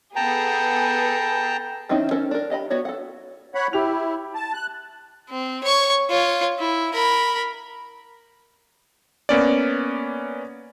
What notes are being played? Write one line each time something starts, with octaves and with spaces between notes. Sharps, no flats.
B3 G#4 A4 G5 A5 A#5
D#3 C4 C#4 D#4 E4
C#4 A4 A#4 C5
D4 A#4
G4 D#5 F#5 B5
B3 F#4 C#5 D5
A4 F#5
C#5 F#5 B5
E4 G4 F7
A5
F#6
C4
C#5 C#6
F4 C#5
E4
A#4 B5
A#3 B3 C#4 D5